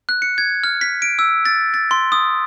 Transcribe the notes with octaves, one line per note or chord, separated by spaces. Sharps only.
F#6
C#7
G#6
F6
B6
D7
E6
A6
A6
C6
D#6